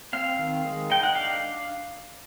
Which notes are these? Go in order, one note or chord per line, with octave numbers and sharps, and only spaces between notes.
C4 F5
D#3
G#3
D#4 G5
F#5
D4 F5